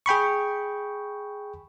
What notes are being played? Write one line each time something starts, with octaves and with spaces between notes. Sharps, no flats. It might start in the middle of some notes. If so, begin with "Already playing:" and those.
G#4 G5 B5 C#6